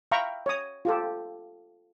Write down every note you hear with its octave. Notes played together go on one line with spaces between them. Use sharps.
E5 F5 G5 A#5 B5 C#6
C#5 D#6
F4 G4 A4